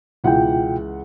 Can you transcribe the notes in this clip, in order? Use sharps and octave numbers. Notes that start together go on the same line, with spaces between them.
C#2 B2 E3 F4 F#5 G5